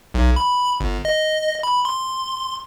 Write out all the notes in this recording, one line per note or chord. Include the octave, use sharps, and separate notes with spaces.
B1
B5
G1
D#5
B5
C6